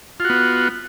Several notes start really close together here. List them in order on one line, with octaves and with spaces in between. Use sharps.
F4 F#4 B3